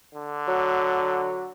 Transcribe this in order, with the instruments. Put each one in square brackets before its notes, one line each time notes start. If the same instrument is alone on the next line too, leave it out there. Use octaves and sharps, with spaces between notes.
[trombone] D3
[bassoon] F#3